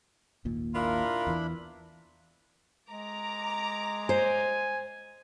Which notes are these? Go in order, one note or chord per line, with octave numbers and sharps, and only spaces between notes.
G#1 D#2 A#2
D4 E4 F4 A#4 B5
E2 E3
G#3 A#5 D6
C5 G#5